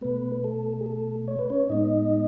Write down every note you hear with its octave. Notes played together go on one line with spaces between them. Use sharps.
B2 A3 B3 B4
A4
G#4
A4
C#5
B4
C#4 C#5
A2 G#3 B3 D#4 D#5